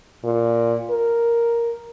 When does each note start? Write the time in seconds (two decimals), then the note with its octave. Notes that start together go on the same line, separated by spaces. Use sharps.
0.25 A#2
0.90 A#4